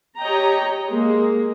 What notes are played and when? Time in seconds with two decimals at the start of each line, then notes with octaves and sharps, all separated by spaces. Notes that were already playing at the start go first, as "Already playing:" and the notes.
0.18 G4 C#5 D#5 G5 A#5
0.87 G#3 A#3